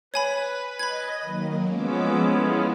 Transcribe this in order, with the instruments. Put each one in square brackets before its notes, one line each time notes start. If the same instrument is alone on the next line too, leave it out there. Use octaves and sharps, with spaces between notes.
[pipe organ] B4 [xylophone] C#5 G#5 B5
[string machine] D#5 [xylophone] B5 G#6
[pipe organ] D#3 [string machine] F#3 A#3
[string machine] F3 D6 E6 [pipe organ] G#3 B3 C#4
[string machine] A3 E4 F5